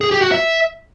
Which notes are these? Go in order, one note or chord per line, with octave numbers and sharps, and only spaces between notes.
G#4
G4
F#4
E5